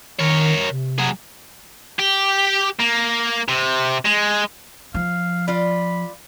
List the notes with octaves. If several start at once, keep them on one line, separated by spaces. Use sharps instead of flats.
D#3 A#4 C#5
C3
F#3 G#4
G4
A#3
C3
G#3
F3 F5
F4 D5 B5